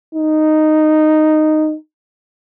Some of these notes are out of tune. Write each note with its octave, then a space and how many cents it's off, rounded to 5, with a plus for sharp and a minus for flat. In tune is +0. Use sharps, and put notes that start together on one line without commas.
D#4 -10